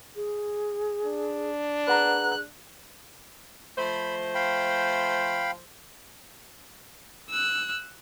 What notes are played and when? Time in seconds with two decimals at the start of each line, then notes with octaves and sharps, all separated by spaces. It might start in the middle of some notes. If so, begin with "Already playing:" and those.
0.16 G#4
1.05 D4
1.88 G#4 B4 F#5 A#5 F#6
3.78 F3 A3 C5 B5
4.35 F5 G5 B5
7.30 E6 F#6